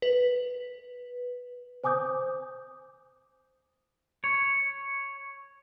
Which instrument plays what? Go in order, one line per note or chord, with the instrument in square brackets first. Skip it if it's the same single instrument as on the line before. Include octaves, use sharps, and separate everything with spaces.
[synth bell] B4
[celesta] C5 G#5 D6 D#6 G6
[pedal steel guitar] C#5